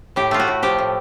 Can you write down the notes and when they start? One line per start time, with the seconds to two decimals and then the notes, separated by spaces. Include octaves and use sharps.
0.16 A2 G4
0.31 A3 F4
0.40 F#4
0.48 A2
0.63 F3 G4
0.79 A2